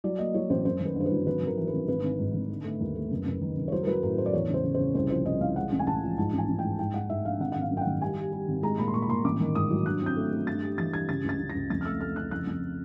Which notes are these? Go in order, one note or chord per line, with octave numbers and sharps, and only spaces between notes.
F#3 D5
A#3 D#5
F#3 C#5
A1 C5
F#2 C5
D#3
B4
G1 C5
B4
F#3
G#1 B4
G#1
A#4
E3
B4
G#1
G#1 B4
G#1
G#2
G#1
D3
A3
D#2
A3
F#1
F#1
D#3
F#1
C#5
F#3 C5
A#4
F#3 B4
A2 A#4
A2 C5
D5
E2 C#5
C#3
C5
C#3
C#3 C5
C2 C5
F3 C5
C2 D#5
C2 F5
G#3 F#5
A1
G#5
A1 A5
F3
G#2 A5
A1
G#5
A1
G#2 G5
G#2 G5
G#2 F#5
G#2 E5
A#1 F5
G#1 F#5
G#1 F#5
F5
F#2
G5
F#5
D#3
G3 G#5
G3
G3
G#1
G#3 A#5
A#2 B5
C6
A#2 C#6
B5
A#2 C6
A1 D6
D#3
G#2 D#6
F#3
G2 F#6
C4 G6
A3
A3
G2 A6
G3
E3 A6
G3 G#6
C#3 A6
C#2 A6
C#3
A#6
C#2
F2 A6
F6
A3 E6
A3 F6
C#3 F#6
F2 F#6
F2